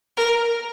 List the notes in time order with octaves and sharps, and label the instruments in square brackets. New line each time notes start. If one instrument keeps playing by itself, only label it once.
[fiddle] A#4